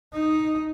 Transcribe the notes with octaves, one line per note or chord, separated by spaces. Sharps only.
D#4